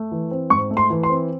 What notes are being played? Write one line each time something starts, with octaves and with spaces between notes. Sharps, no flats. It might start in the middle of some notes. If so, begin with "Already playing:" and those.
Already playing: A3
E3
C4
G#2 C#6
A3
C6
E3
C6
C4